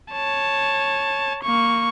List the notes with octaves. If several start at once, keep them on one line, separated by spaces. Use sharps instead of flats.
C#5 A5
A#3 C#6